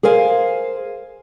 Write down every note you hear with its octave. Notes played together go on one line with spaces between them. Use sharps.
G#4 A#4 C5 F5 G#5